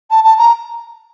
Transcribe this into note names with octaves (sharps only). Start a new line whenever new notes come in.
A5
A5
A#5